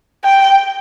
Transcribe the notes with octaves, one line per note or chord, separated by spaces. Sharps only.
G5